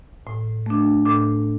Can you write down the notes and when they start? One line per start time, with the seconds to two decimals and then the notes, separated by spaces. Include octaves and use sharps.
0.27 A2
0.66 A3 D4
1.05 A2 D6